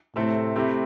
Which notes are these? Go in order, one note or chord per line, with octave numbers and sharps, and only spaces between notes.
A2 C3 A3 C4 A4 E5
C3 A3 C4 E4 G4